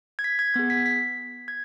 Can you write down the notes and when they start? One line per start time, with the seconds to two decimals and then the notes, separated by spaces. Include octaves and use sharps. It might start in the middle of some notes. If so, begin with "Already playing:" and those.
0.19 G#6
0.24 B6
0.39 G#6
0.54 B3 G#4 G#6
0.70 B6
0.86 B6
1.48 G#6